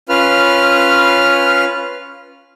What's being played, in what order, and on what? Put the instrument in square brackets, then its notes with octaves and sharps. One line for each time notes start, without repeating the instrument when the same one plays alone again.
[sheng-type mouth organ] C#4 F4 B4 F6